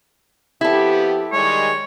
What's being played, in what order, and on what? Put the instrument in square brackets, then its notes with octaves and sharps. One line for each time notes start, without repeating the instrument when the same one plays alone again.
[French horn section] F2 B3 G4 [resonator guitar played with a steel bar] E4 A4
[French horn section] D#3 G3 G#3 [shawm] C#5